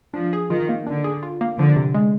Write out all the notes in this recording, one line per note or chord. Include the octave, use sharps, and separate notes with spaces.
F3 D4
G#4
D#3 F4
A#3
D3 D4
G#4
F4
A#3
D3 F3
C3
G#3